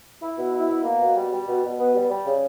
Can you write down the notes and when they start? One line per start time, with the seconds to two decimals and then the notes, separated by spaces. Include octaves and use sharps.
0.22 E4
0.37 B2
0.54 E4
0.69 B2
0.84 A#3
1.00 B2
1.15 G3
1.31 G3
1.47 B2
1.62 B2
1.79 B3
1.94 G3
2.09 G3
2.25 C#3